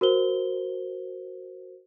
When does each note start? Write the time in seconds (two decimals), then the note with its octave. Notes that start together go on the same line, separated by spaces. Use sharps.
0.01 F#4 A#4 C5 G7